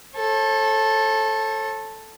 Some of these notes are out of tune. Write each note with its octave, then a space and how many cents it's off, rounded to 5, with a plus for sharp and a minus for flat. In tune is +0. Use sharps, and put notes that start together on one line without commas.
A4 +0 C#5 -40